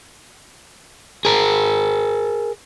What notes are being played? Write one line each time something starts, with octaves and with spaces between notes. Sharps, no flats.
G#4 A#4